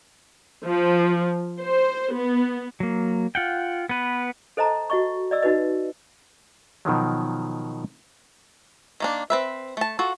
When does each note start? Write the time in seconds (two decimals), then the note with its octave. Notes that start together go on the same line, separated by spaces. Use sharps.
0.63 F3
1.60 C5
2.13 B3
2.80 F#3 A#3
3.35 F4 F#5 G5
3.89 B3 B4
4.57 A4 C5 D#5 A5 A#5
4.90 F#4 D#5 C#6
5.31 D5 D#5 E6
5.42 D#4 F#4 B4 D#5
6.85 B2 D#3 F3 F#3
9.00 D#3 A#3 D4
9.30 C4 B4 E5
9.77 A3 A5
9.99 F4 F#4 A4